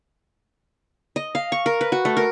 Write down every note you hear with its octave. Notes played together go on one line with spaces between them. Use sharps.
D#5
F5
C#6
A#4
B4
F#4
A3
A#4